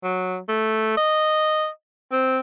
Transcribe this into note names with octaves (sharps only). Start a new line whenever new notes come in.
F#3
A3
D#5
C4